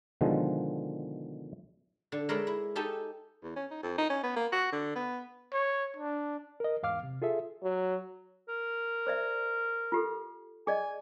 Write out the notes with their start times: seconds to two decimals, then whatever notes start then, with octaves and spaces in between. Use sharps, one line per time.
0.21 B2 D3 D#3 F3 G#3
2.12 D3
2.29 G#3 A#4 B4 C#5 D5 E5
2.47 E4
2.76 D#4 G4 A4 G#5 A5
3.43 E2
3.56 C#4
3.71 D#4
3.83 F2
3.98 D#4
4.10 C#4
4.23 B3
4.36 A#3
4.52 F#4
4.72 D3
4.96 B3
5.53 C#5
5.97 D4
6.60 A#4 D#5
6.83 E2 G#2 F5 D6 F6
7.03 C3
7.22 F4 G#4 A4 E5
7.63 F#3
8.48 A#4
9.07 C5 D5 E5
9.92 F4 G4 A4
10.67 G#4 D5 D#5 G#5